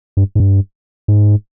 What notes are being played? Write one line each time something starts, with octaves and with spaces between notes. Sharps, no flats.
G2
G#2
G2
G#2